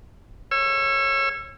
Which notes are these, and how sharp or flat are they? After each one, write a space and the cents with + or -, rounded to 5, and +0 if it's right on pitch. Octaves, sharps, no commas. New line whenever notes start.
C#5 -20 E6 +30